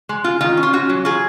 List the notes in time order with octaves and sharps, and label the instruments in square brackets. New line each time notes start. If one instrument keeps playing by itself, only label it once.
[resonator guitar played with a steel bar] G#3
F4
D#3 F4
C#4
F4
C#4 F#4
F#3
F#3 F4 G#4